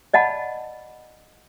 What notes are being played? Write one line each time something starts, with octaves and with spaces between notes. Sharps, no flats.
D5 D#5 F#5 A5 B5